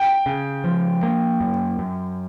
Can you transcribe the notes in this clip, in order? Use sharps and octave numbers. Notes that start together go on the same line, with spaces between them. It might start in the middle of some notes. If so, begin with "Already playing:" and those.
Already playing: G5
C#3
F3
A#3
F#2
F#2